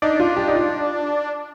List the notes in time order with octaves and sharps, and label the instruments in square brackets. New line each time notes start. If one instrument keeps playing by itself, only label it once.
[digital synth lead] D4 [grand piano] D#4
[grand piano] F4
G4
D#4
F4